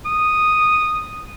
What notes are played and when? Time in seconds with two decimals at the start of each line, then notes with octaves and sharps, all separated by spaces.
0.06 D#6